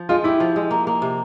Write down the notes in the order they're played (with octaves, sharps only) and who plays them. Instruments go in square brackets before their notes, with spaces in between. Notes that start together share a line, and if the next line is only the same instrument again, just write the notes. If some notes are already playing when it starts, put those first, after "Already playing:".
Already playing: [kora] F3
[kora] G#3 [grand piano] F4
[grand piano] E4 [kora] G4
[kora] F3
G#3
A#3
A#3
C3